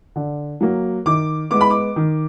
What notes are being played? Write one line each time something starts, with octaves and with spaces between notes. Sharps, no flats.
D3
F#3 A#3
D#3 D6
G#3 B3 D6
B5
D6
D#3